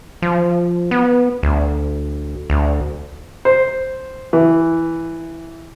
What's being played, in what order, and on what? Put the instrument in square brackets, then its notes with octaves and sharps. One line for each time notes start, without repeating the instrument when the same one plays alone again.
[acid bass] F3
B3
D2
D2
[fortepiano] C5
E3